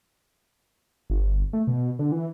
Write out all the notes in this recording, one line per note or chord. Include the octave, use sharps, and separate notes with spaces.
G1
A3
B2
D3
E3